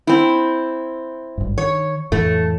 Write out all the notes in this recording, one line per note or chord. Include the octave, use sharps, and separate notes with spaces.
C4 E4
G#1 G2
D#3 C#5
F2 A2 E3 A3